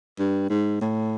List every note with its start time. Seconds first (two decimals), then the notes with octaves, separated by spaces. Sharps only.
0.19 G2
0.50 G#2
0.81 A2